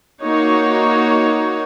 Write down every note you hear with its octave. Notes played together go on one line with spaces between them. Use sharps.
A#3 D#4 F#4 C#5